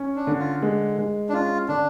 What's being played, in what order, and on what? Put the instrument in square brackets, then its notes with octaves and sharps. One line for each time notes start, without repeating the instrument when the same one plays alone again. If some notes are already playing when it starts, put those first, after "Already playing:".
Already playing: [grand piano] C#4
[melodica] D4
[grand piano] D3
[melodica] F4
[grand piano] G#3
G#3
[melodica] D4
[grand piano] C#4 [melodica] F4
[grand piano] D3 [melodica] D4